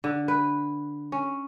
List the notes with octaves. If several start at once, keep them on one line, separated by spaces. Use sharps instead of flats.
D3
B4
C#4